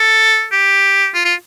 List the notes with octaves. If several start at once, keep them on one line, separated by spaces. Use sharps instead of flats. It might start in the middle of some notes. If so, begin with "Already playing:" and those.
Already playing: A4
G4
F4
F4